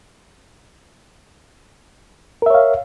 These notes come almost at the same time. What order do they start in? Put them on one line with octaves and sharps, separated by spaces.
A#4 E5 C#5 F5